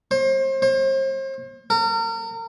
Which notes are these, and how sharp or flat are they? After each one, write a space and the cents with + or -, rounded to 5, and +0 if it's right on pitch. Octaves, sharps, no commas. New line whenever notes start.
C5 +35
C5 +40
A#4 -35